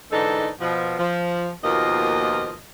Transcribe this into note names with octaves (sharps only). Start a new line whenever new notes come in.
G#2 D3 E3 D#4 A4
B2 F3
F3
D#2 B2 F3 A#3 F4 D#5